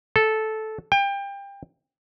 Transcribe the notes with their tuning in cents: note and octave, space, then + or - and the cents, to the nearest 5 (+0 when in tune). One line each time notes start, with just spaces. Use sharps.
A4 -10
G5 +25